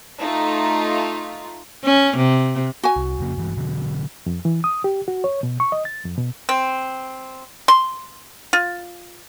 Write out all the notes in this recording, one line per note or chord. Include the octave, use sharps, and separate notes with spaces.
A3 D#4 F4
C#4
C3
F#4 G#5
C2
F2 C#3 A#3
G2 E3 G#3
B2 D3 F#3
F2
E3
D#6
G4
F#4
C#5
B2
C#6
D#5
A6
F2
B2
C4
C6
F4